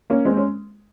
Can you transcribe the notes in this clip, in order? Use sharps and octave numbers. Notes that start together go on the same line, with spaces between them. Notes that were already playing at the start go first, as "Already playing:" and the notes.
A#3 C#4
G#3 C4
C#4